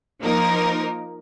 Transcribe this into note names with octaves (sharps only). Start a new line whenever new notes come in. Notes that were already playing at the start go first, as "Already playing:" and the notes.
F3 A#3 D#4 A#4